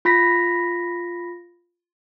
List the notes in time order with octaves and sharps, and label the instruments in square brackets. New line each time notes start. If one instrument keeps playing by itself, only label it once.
[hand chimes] F4 B5 A#6 B6